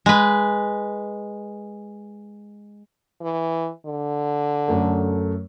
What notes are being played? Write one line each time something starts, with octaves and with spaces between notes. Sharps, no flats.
G#3 B4
E3
D3
F#2 A3